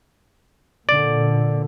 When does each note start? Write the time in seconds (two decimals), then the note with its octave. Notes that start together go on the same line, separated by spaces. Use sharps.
0.89 A#2 D3 D5